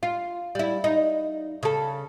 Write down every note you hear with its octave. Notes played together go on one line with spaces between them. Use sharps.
F4
G3 E4
D#4
C#3 A4